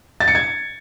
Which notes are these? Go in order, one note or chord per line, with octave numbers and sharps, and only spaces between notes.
A6
C#7
G#6